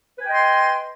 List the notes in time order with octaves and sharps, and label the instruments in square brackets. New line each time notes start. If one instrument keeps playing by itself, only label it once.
[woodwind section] B4
G#5
G5
D#5
C6